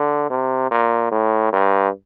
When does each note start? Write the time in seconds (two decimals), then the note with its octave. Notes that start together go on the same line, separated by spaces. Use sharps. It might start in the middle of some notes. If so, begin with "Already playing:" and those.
Already playing: D3
0.30 C3
0.71 A#2
1.11 A2
1.53 G2